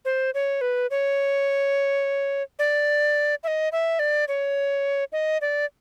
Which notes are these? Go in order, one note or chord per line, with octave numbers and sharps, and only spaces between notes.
C5
C#5
B4
C#5
D5
E5
D#5
E5
D5
C#5
D#5
D5